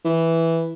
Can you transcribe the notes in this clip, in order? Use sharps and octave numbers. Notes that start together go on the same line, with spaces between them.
E3